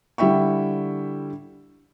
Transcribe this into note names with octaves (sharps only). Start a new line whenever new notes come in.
D3 G3 E4 E5 G5 C#6